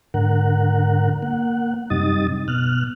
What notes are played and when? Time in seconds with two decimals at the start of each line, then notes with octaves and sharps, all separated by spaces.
0.14 G#2 D3 A#4 F#5
1.23 A#3 F#5
1.90 F#2 C3 G3 D#4 D#6 A6
2.48 B2 F6 F#6